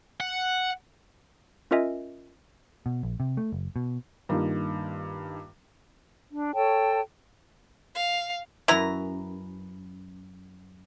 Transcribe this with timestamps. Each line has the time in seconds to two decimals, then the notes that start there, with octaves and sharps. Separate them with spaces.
0.20 F#5
1.71 C#4 F4 A#4 D#5 E5 G#5
2.86 B2
3.03 A#1
3.20 C3
3.37 A3
3.52 F#1
3.76 B2
4.29 G2 D#3 A#3 F4
6.31 D4
6.54 A4 C#5 G5 A5
7.95 F5
8.68 F#2 E4 B4 A#5